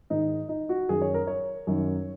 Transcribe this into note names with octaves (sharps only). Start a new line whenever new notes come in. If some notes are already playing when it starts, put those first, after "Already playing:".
G#2 D#3 D#4
D#4
F#4
F#2 D#3 G#4
C#5
A#4
C#5
F#2 D#3